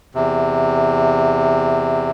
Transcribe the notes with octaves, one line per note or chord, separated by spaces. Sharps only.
E2 C3